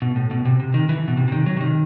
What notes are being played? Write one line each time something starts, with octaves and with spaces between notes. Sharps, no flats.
B2
A2
B2
C3
C3
D#3
E3
B2
C3
C3
D#3
F#3
C3
D#3